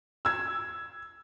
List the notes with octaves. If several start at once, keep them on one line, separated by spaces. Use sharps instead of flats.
E6 G#6